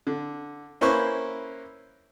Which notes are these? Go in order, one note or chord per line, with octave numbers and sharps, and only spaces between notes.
D3
A#3 C#4 E4 B4 C5 C#6